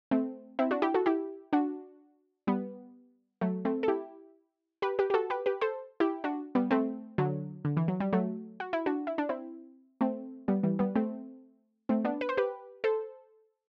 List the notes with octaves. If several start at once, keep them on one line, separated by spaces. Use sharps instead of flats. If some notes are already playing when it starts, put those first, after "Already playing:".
A3 C4
C4 E4
D4 F#4
E4 G4
F#4 A4
E4 G4
D4 F#4
G3 B3
F#3 A3
A3 C4
A4
E4 G4
G4 B4
G4 B4
G4
F#4 A4
G4 B4
G4 B4
A4 C5
E4 G4
D4 F#4
G3 B3
A3 C4
D3 F#3
D3
E3
F#3
G3
F#3 A3
F#4
E4
D4 F#4
E4
D4
C4 E4
A3 C4
G3 B3
E3 G3
G3 B3
A3 C4
A3 C4
B3 D4
B4
C5
G4 B4
A4 C5